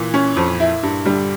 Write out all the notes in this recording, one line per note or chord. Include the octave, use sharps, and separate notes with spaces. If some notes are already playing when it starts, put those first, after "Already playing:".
Already playing: A#2 E3
C#4
F2
E4
G2
D3 G3